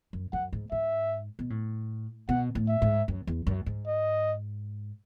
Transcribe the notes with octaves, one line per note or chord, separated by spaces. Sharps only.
F#2
F#2 F#5
G#2
G#2 E5
B2
A2
B2 F#5
A2
E5
G#2
F#2
E2
F#2
G#2
D#5